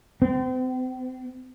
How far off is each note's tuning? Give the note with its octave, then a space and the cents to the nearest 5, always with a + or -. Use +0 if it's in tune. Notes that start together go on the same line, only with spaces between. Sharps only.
C4 -40